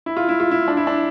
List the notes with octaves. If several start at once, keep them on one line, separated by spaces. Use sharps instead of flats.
E4
F4
E4
F4
E4
D4
E4
D4